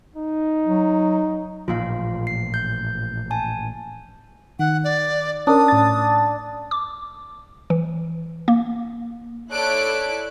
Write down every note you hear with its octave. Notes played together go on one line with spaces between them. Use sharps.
D#4
F#3
A1 A#2 F3 F4 F5
C7
G6
G#5 A5
D#3 F#5
D5
C#4 D4 A#4 D#6
A2 A6
D6
E3
A#3
E4 A4 C#5 D5 F#6 D7